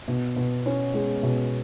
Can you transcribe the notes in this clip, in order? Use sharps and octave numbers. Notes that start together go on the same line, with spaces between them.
B2
B2
C#4
G#3
B2